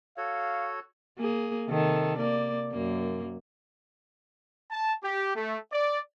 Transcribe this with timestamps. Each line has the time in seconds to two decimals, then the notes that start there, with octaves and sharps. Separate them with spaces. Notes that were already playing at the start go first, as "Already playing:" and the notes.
0.17 F#4 A4 C#5 F5
1.19 A#3 G#4
1.67 C3 D#3 A4
2.18 A#3 D5
2.73 F#2 A#3
4.71 A5
5.03 G4
5.35 A3
5.72 D5